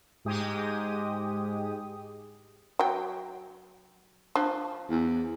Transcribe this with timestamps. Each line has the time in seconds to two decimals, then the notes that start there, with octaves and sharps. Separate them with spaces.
0.25 G#2 G#3 G4 D#6
2.79 F#3 G5
4.35 F3 D4
4.90 E2